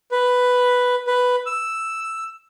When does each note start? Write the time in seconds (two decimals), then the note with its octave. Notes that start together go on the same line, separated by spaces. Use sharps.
0.11 B4
1.07 B4
1.46 E6